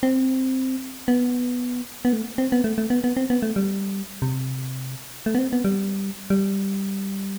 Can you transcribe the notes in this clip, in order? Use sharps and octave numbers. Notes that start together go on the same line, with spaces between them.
C4
B3
B3
A3
C4
B3
A3
A3
B3
B3
C4
B3
A3
G3
C3
A3
B3
C4
B3
G3
G3